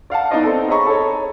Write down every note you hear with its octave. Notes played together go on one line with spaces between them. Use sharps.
D5 F5 F#5 A5
B3 D#4 E4 D5 D#5
C4 A4
G#4 C#5 D#5 A#5 B5 C#6
A4 C#5